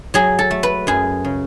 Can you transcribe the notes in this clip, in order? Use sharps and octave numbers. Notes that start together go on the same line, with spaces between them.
F#3 G#4
A4
A3
B4
F#2 G#4
C#3